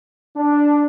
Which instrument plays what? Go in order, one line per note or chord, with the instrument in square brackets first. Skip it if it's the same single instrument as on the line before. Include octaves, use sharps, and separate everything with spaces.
[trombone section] D4